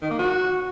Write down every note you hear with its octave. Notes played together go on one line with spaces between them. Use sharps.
D#3
A#3
F#4